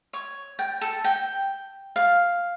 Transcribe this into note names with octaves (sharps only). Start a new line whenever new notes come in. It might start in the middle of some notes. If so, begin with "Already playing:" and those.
C#5
G5
A4
G5
F5